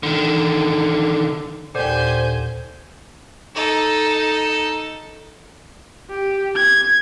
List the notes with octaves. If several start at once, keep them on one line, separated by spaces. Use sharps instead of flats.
D3 D#3
D#2 A#2 D3 G4 C5 G#5 G6
D#4 A4
G4
G#6